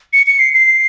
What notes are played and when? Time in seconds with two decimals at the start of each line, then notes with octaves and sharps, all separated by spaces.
0.13 C#7
0.27 C#7
0.39 C7
0.54 C7